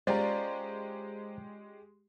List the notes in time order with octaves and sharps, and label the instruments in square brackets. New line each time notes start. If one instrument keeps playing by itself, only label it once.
[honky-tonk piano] G#3 G4 [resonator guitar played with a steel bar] C#4 F4 D5 [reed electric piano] C5 A#5